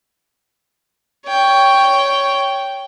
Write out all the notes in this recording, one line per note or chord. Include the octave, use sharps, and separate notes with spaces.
C#5 G5